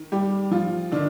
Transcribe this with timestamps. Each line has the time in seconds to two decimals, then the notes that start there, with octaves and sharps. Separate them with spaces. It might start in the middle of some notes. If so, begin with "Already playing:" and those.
Already playing: D#3
0.12 G3 G4
0.51 F3 F4
0.92 D3 D#3 D4